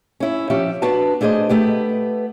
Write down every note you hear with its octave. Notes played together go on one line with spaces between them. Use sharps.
C#4 E4
F3 C#4 G4 E5
B3 D4 F#4 B4 A5
A3 D4 G#4 C5 D#5
A3 B3 G4